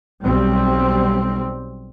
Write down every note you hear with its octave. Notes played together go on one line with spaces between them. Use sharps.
B1 G3 C4